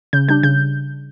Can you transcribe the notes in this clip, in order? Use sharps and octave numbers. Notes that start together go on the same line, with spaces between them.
C#3 G6
G3 D4 G6
C#3 G6